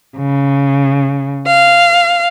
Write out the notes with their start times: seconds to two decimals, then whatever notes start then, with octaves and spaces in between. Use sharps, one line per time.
0.19 C#3
1.46 F5